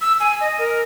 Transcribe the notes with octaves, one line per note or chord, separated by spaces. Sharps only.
E6
G#5
D#5
A#4